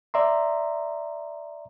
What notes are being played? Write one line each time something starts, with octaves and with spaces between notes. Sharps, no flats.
D5 E5 A#5 C6